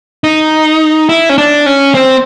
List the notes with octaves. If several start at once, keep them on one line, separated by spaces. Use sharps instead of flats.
D#4
E4
C#4
D4
C#4
C4